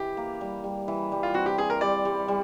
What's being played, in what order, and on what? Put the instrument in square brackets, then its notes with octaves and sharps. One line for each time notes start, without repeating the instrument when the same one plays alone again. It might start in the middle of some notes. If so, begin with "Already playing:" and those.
Already playing: [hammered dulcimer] E3 [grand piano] G4
[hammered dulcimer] A#3
G3
G3
E3
G3
[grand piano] F4
[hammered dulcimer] C4 [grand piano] F#4
[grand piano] G4
[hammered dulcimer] C4 [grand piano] G#4
[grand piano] A#4
[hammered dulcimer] G3 [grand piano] D5
[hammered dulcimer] G3
G3